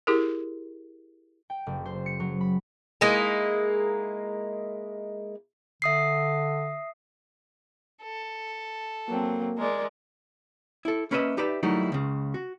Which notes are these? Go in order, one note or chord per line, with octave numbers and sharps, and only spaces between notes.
E4 G4 G#4 A#4
G5
F#1
C5
C#7
F#3
B5
G#3 A#3 D#4 E4
D3 E5 D#6 C7
A4
F#3 A#3 C4
G#3 A#4 D5
E4 A4
A#3 C#4 B4 C#5 D#5 E5
D#4 G4 B4 D5 E5
F#3 G3 A3 A#3 D#4 E4
C#2 C#3
F#4